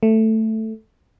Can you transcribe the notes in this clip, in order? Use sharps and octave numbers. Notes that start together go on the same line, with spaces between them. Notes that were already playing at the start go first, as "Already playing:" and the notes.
A3